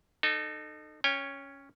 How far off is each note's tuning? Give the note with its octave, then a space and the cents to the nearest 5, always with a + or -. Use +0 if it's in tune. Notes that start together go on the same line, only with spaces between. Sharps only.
D#4 -30 A4 +5
C#4 +0 C#5 +0 G5 +40